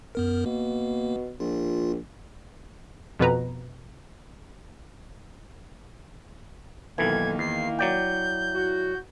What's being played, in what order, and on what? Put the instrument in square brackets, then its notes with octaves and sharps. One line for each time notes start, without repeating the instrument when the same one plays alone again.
[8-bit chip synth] F#2 B3 A#4
[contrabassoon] B2 [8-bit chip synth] A#3
[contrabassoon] A#1 [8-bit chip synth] F4
[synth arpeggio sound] F2 B2 B4 A#5
[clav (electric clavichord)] B1 E3 [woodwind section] D#3 A#3 [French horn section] A4 [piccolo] G#6
[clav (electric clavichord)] E2 [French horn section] E4 [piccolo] C7
[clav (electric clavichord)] F#3 D5 G5 [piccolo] G6
[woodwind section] F#4